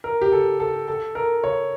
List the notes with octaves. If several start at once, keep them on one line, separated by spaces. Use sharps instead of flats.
A#4
G4
A4
A4
A4
A#4
C#5